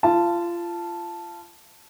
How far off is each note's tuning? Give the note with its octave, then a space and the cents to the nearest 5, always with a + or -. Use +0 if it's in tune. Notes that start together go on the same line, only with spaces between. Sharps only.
F4 -25 A5 +0